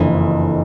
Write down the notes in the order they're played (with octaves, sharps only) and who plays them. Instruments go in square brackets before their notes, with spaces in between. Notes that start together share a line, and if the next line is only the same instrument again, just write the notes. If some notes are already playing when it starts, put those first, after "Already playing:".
Already playing: [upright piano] F#1 F2 D3 [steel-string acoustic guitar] E3